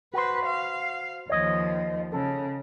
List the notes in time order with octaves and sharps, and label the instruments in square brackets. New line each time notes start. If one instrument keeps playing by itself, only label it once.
[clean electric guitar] F#4 C5 [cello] B4
[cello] F5
[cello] D#2 F3 [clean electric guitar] C#5 D#5
[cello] C#3 [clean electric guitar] A4